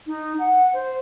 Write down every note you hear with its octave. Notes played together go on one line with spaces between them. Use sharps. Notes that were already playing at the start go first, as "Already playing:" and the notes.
D#4
F#5
C5